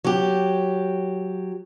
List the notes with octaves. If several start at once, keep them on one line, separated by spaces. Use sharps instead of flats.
F#3 G4